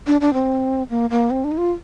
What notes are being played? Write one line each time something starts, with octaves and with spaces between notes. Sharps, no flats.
D4
D4
C4
A#3
A#3
C4
D4
D#4
F4